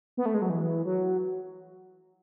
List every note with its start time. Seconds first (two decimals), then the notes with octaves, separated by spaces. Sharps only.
0.17 B3
0.26 A3
0.34 G#3
0.42 F#3
0.50 E3
0.85 F#3